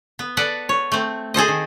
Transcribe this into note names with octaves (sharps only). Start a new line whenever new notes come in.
B3
A4 B4 D5 F#5
C#5
A3 C4
G#4 A4 C5 D#5
D#3